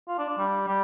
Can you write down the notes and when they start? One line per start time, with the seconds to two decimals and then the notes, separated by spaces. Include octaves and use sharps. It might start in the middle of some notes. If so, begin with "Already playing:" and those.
0.08 F4
0.18 D4
0.29 D4
0.38 G3
0.68 G3